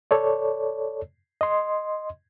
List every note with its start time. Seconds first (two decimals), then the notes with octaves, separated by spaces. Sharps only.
0.11 A4 C#5 D5
1.41 D#5 C6